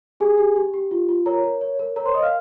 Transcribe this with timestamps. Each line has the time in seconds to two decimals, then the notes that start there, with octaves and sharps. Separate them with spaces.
0.20 G4 G#4 G#5
0.38 G4
0.56 G4
0.74 G4
0.91 F4
1.09 F4
1.26 A#4 C#5 A#5
1.44 A#4
1.61 C#5
1.79 A#4
1.96 A#4 C#5 A#5
2.06 C5 C6
2.14 A#4 D#5 D#6
2.23 F5 F6